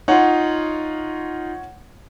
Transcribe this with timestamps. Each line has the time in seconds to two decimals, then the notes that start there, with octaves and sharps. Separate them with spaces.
0.08 D#4 F4 C#5 F#5